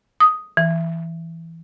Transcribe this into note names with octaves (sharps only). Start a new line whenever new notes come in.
D#6
E3